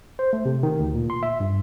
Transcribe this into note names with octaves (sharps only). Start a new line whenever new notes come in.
C5
A3
C3
D#3
D2
A#2
C6
E5
G2